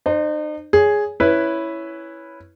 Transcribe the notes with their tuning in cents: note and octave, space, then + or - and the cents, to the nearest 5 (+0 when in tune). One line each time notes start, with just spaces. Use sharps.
D#4 -40 C5 +0
G#4 +0 C#5 +20
C#4 +0 E4 +0 B4 +0